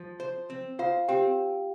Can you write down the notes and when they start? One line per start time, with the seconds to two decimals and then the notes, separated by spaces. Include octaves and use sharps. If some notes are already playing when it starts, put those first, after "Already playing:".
Already playing: F3
0.20 C5
0.50 C4
0.79 F4 C5 F5
1.08 C4 G4 G5